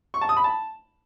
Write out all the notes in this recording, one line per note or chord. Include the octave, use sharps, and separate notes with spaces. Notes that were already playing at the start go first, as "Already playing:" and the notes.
C#6
A5
D#6
B5
A5